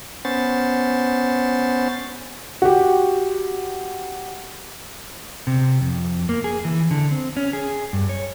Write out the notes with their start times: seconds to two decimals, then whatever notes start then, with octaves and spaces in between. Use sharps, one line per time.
0.25 B3 C#4 C5 A6
2.62 F#4 G4
5.47 C3
5.81 F2
6.29 A#3
6.44 G#4
6.65 E3
6.91 D3
7.11 C4
7.37 C#4
7.53 G#4
7.93 G2
8.09 C#5